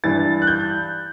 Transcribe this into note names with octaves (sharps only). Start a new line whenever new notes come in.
G2 E3 A6
F#6
G6